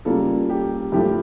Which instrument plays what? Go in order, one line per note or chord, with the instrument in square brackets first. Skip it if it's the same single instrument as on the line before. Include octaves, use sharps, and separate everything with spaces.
[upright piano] C#3 G3 A#3 F4 A4
G4
G2 F3 A3 G4